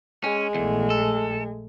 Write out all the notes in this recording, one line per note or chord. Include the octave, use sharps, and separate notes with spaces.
G#3 C#4
A#1 E2 A3
A4